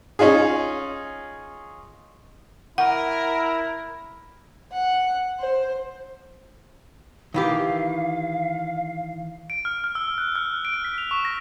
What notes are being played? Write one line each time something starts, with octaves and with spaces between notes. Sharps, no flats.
C#4 D#4 F4 G#4
E4 A#4 F#5
F#5
C5
D#3 E3 G4 F5
D7
F6
F6
E6
F#6
F6
D7
B6
F7
C#6
A#6